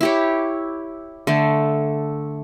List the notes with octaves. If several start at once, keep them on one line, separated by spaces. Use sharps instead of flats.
E4 G4 C#5
D3 A3